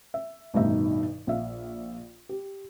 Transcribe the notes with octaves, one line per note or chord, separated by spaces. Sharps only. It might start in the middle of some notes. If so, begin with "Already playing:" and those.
E5
A1 G2 B2 D#3 D#4 E5
A#1 E5 F5
G4